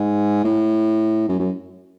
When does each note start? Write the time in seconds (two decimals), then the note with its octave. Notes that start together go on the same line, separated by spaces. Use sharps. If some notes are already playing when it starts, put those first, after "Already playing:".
Already playing: G#2
0.44 A2
1.29 F#2
1.40 F#2